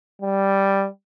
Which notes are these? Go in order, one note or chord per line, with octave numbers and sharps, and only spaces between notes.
G3